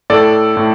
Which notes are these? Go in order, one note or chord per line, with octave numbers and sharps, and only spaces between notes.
A2 A4 D5
A2